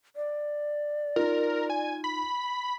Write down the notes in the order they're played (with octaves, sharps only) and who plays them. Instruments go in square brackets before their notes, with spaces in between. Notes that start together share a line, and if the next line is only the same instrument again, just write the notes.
[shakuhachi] D5
[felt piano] D#4 F4 [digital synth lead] A#4
[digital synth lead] G#5
B5